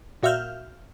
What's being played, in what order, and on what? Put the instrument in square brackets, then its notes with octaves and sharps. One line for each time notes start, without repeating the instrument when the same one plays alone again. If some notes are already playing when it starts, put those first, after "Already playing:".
[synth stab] A#2 F#4 E5 F5 F6 G6